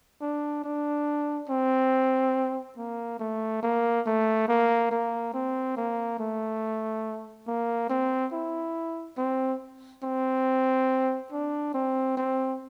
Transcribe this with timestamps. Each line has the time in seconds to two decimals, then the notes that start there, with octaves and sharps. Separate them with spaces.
0.21 D4
0.64 D4
1.49 C4
2.77 A#3
3.20 A3
3.63 A#3
4.06 A3
4.49 A#3
4.91 A#3
5.34 C4
5.77 A#3
6.19 A3
7.47 A#3
7.90 C4
8.33 E4
9.18 C4
10.03 C4
11.32 D4
11.74 C4
12.17 C4